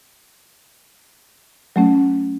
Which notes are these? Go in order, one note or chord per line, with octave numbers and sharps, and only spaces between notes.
F#3 A3 C#4